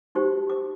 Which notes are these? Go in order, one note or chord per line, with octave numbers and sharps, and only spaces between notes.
D#4 G4 C5 C#6
D6